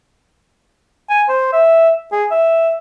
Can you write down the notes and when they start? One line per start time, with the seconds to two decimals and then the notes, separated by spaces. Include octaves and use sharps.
1.10 G#5
1.29 C5
1.53 E5
2.12 G#4
2.31 E5